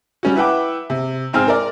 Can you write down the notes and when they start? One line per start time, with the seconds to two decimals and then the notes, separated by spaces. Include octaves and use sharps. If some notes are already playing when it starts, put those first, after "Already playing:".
0.23 G3 C#4 F#4
0.36 E4 B4 E5 F#5 G5 D6
0.90 C3
1.33 G#2 C4 G#5 F6
1.48 A#4 D5